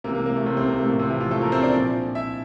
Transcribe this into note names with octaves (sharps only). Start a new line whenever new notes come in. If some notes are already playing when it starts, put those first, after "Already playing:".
C3 E3 A#3
A#3
A#3
A3
C3 C4
C3 C4
A#3
A3
A2 F3 A#3
C3 C4
E3 E4
F3 F4
A3 A4
A#3 A#4
C4 C5
D4 D5
A#2 F3
E4 E5